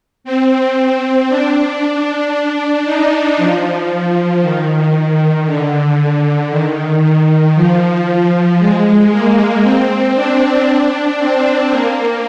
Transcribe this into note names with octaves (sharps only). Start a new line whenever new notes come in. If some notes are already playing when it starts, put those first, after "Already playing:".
C4
D4
D4
D#4
F3
D#3
D3
D#3
D#3
F3
G#3
A#3
C4
D4
C4
A#3